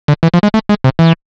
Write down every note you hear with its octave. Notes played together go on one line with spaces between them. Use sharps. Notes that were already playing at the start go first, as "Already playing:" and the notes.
D3
E3
F3
G#3
A3
G#3
C3
E3